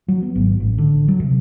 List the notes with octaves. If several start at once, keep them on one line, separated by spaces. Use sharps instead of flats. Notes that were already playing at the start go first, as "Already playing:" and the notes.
F#3
B3
G#1
A1
D3
F#3
C3